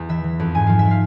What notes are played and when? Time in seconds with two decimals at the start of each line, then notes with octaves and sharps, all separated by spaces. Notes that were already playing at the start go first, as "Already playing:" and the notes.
Already playing: E2
0.09 E3 E5
0.24 E3
0.40 F2
0.55 G#2 G#5
0.67 F3 F5
0.79 E5
0.85 F3
0.91 F5